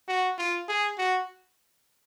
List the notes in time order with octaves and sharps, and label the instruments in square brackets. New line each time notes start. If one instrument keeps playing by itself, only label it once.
[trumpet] F#4
F4
G#4
F#4